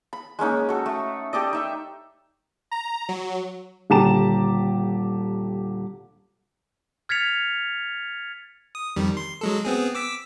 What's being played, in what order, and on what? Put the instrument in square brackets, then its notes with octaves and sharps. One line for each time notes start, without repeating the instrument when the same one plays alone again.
[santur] B5
G#3 A#3 C#4 D#4
F#4 A4
A3
G4 A4 D5 D#5
D#4 E5
[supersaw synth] A#5
F#3
[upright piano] D#1 D3 G4 A5 A#5 E7
[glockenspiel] F6 G#6 A6 B6 C#7 F7
[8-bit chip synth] D#6
F2 D#3 G3
C6
F#3 G#3 A4
B3 C4 G#4
D6 E6 B6